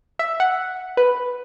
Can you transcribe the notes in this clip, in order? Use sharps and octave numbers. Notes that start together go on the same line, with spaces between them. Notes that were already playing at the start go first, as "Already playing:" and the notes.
E5
F#5
B4